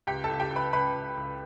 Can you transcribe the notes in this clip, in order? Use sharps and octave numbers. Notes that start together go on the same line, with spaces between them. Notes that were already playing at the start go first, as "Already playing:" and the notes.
C#2 G4 G5
A4 A5
C#2
G4 G5
C#2
B4 B5
C#2 B4 B5
C#2
C#2